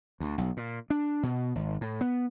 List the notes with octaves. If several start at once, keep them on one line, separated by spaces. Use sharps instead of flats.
D2
B1
A#2
D4
B2
G#1
A2
B3